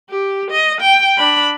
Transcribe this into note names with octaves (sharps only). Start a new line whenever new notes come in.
G4
D#5
G5
D4 B5